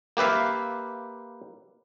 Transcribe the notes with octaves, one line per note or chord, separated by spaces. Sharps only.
A#3 G4 B4 E5 F5